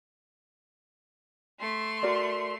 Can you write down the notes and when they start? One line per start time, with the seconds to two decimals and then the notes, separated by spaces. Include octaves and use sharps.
1.60 A3 C6
2.03 F#4 A#4 D5